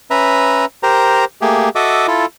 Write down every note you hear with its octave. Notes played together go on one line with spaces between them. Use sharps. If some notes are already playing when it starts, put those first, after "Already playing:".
C#4 B4 E5 A#5
G4 A#4 C5 A#5
A3 A#3 G4 G#4
F#4 A4 D#5 E5 D6
E4 F4 A4